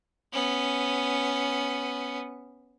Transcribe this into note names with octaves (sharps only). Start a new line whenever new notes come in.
B3 C#4